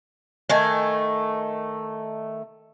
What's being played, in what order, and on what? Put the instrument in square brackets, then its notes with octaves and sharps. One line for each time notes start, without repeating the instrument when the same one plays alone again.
[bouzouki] D#3 A3 G#5